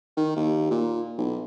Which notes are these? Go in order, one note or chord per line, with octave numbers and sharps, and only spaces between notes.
D#3
D#2
A#2
B1